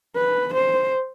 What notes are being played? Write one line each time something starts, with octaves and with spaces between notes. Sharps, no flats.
B4
C5